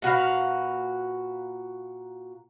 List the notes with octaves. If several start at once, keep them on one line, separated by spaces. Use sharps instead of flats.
A#2 F#4 B4 F5